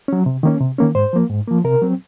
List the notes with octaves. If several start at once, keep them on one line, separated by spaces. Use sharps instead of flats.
F#3 C#4
C3
D#3 A#3 C#4
C3
D#3 A#3 C#4
G#2 C5
F3 A#3
G#2
F3 A#3
C3 A#4
F#3 C4